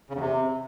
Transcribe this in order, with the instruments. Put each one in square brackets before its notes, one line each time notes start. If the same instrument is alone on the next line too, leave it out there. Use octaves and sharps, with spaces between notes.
[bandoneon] C#3
E2
C3